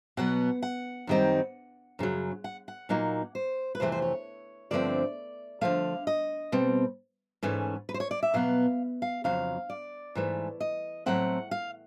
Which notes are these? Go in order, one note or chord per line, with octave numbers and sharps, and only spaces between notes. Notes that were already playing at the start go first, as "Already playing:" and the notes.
B2 F#3 B3 F#5
F#5
F#2 D#3 G3 C4 D#4
F#2 C#3 F#3
F#5
F#5
A#2 F#3 A#3 D#4
C5
B4
F2 C3 E3 A3 C5
C5
C#5
G2 D3 F3 A3 C4 D5
D3 F3 A3 F5
D#5
B2 G3 C4
G#2 E3 A3 C#4
B4
C5
C#5
D5
E5
B2 F#3 B3 F5
F5
F2 C#3 F#3 F5
D5
G#2 E3 A3
D#5
A2 F#3 A3 C4 F#5
F5